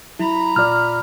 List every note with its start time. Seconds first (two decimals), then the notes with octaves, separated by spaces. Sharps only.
0.19 F#3 E4 A#5 B5
0.56 A#2 F4 D5 F6